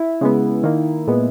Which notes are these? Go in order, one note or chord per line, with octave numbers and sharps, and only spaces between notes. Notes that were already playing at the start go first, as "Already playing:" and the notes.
Already playing: E4
C#3 G#3 B3
D#3 A#3
A#2 G#3 B3